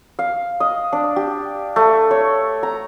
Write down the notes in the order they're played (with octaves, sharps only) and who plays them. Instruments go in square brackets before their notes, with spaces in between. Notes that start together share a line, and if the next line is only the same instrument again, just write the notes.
[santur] F5
D#5
D4
G4
A3
C#5
A#5